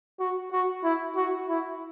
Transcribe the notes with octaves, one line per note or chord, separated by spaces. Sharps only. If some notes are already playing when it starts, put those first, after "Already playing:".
F#4
F#4
E4
F#4
E4